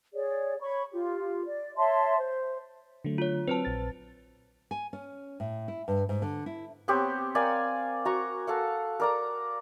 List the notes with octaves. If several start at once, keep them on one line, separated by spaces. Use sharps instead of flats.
G#4 C#5 D5
C#5 B5 C#6
F4 G4
D5
C#5 E5 A5 C6
C5
D3 F#3 A3
F4 C#5
F#3 C4 B4 C5 A5
A#1 A6
G#5
C#4
A2
E4
G2
G#2
D3
E4
B3 C4 G4 C#5
A#4 D5 F5 G#5
F#4 A#5 C#6
A4 F5 F#5
A#4 D5 A#5